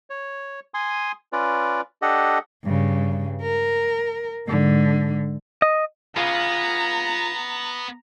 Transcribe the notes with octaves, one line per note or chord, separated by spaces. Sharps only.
C#5
G#5 C6 D#6
C#4 F4 B4 D5
D4 G4 A4 D#5 F#5
G2 C#3
A#4
G#2 D3
D#5
B3 F4 G#4 F5 A#5